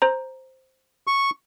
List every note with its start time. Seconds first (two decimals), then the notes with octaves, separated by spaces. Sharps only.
0.02 C5 A#5
1.07 C#6